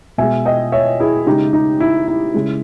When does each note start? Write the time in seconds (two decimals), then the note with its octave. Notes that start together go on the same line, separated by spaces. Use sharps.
0.18 B2 G#3 E5 G#5
0.45 D#5 G5
0.72 C#5 E5
1.00 E4 G#4
1.27 C#3 G#3 D#4 G4
1.53 D#4
1.80 E4
2.08 E4
2.34 C#3 G#3